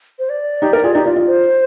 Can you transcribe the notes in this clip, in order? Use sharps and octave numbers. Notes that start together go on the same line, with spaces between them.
C5
D5
D#4 G4
G4 A#4
F4 G#4
D#4 G4
F4
F4
C5